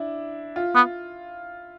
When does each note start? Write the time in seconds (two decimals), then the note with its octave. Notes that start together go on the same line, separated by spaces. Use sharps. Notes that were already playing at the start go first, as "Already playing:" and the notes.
Already playing: D4 E4
0.56 F4
0.75 B3